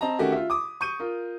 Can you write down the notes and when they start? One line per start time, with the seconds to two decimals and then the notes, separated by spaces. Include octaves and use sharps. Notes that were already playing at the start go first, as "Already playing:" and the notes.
0.01 C4 D#5 A5 A#5
0.19 D#3 A3 C#4 F#4 G4 A#4
0.32 F4 E5
0.50 D6 D#6
0.81 C#6 G6 D#7
1.00 F4 A#4